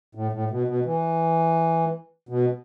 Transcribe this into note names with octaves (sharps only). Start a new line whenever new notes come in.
A2
A2
B2
B2
E3
B2